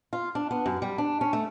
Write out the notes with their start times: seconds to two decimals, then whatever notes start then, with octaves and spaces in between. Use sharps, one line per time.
0.13 F4
0.35 D4
0.51 B3
0.66 F#2
0.82 G3
0.98 D4
1.21 C#4
1.33 A3